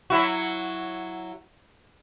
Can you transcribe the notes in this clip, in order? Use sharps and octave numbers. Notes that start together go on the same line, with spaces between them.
F#3 E4 F#4